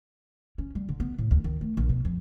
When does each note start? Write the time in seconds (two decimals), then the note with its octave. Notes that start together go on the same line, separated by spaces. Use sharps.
0.58 C#4
0.75 G3
0.89 D3
1.00 B3
1.18 A2
1.31 D2
1.44 D#3
1.61 A3
1.77 A#1
1.89 B2
2.05 F2